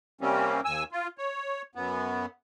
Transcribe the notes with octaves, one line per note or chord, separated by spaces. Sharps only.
C3 G3 A#3 C4 C#4
D#2 G#5 E6
F4
C#5
F#2 B3